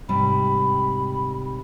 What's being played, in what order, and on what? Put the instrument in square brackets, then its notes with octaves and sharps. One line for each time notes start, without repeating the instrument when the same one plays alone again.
[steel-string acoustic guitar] G#2 C3 G3 [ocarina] B5